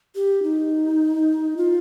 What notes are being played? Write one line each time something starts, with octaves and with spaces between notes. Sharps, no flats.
G4
D#4
F4